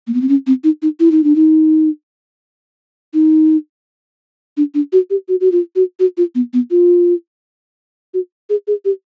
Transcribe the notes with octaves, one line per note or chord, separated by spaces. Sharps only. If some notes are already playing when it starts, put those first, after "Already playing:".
A#3
B3
C4
C#4
C4
D#4
D#4
E4
D#4
D4
D#4
D#4
D4
D4
F#4
G4
F#4
F#4
F4
F#4
F#4
F4
B3
B3
F4
F#4
G#4
G#4
G4